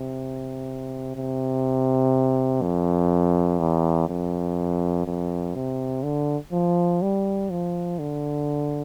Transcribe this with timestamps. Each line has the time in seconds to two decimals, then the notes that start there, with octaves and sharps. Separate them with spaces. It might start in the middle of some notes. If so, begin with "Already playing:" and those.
Already playing: C3
1.16 C3
2.62 F2
3.59 E2
4.08 F2
5.06 F2
5.55 C3
6.03 D3
6.52 F3
7.02 G3
7.50 F3
7.99 D3